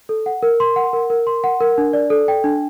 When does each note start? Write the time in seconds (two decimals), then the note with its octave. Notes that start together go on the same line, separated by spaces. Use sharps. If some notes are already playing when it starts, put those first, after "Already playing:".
0.09 A4
0.26 F#5
0.43 A#4
0.60 C6
0.76 F#5
0.93 A#4
1.10 A#4
1.27 C6
1.44 F#5
1.61 A#4
1.78 D4
1.93 D5
2.10 A4
2.28 G5
2.44 D4